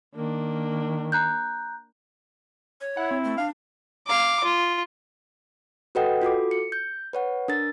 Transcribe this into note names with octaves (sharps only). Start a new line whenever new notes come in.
D#3 A#3 D4
A#5 F#6 G6
C#5
E4 F#5
C4
A3
D4 F5
F5 D6
F4
F#4 A4 B4 D#5 F#5 G5
F4 F#4 A4 D6
C#7
G6
B4 C#5 F#5
D4 A#4 A6